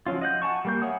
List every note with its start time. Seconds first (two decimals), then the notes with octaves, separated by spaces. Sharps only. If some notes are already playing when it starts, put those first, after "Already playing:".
0.06 F3 F#3 C#4 F4
0.21 D#5 F#5 G6
0.42 F#5 G#5 A5 C#6
0.65 G3 A#3 G6
0.82 C#5 E5 F#5 G#5 D#6